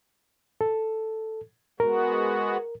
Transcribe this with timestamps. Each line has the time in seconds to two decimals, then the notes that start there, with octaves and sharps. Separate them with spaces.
0.61 A4
1.80 G#3 B3 F#4 A#4